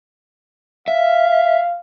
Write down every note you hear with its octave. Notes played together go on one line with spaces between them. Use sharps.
E5 F5